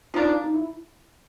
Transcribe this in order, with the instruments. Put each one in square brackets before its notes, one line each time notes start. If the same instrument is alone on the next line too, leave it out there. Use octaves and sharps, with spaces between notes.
[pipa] F3 A#3 D4 [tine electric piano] D#4 F4
[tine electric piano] D#4
E4